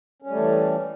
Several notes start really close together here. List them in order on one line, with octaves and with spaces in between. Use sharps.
C#4 G3 A3 E3